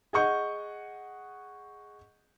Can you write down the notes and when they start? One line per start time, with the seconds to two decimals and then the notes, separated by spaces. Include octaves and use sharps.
0.13 G#4 D#5 F#5 C#6 G6